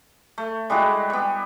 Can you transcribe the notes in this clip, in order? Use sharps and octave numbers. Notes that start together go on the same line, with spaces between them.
A3
G3 G#3 E4 F#4
G3 B3